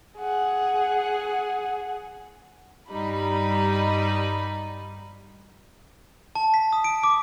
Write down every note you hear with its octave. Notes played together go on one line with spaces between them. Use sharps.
G#4 F#5
G2 G3 D#4 B5
A5
B6
D#6
D7
D6